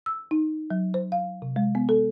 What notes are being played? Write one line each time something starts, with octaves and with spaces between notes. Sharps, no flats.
E6
D#4
F#3
C5
F5
C3
G#3
B3
A4